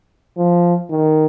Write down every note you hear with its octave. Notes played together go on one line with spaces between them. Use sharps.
F3
D#3